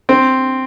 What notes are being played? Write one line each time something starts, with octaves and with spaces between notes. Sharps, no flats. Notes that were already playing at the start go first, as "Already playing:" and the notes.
C4